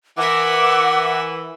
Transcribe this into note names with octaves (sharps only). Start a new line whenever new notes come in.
E3 A#4 E5 F#5 D6